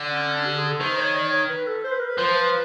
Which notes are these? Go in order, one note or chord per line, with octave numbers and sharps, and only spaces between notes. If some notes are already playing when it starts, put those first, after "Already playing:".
Already playing: D3
C#4
C#4
C#4
G4
G#4
A4
D#3 C5
C#5
D5
C#5
B4
A4
C5
B4
A#4
B4
F3 C5
B4